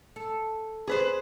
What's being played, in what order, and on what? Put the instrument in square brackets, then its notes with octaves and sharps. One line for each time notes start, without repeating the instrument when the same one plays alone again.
[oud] A4
[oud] B3 [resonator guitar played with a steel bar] G#4 B4 C5